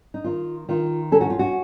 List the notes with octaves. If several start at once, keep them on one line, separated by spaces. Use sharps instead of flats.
D#4
D#3 F4
D#3 F4
C#4 A4
F#4
F4
F#4